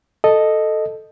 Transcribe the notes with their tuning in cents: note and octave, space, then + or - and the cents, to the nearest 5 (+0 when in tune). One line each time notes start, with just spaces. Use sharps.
A4 +0 D#5 -5